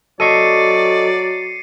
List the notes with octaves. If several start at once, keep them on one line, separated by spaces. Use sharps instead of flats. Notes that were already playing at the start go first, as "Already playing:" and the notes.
F#3 A4 D5 D#5 C#6 C7 C#7 D#7